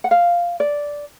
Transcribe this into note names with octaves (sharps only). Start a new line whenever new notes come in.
F#5
F5
D5